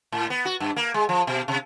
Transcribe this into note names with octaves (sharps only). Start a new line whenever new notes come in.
A2
B3
F#4
G2
A#3
G#3
F3
B2
C3